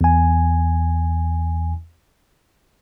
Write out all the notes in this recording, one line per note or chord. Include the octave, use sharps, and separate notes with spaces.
E2 G#5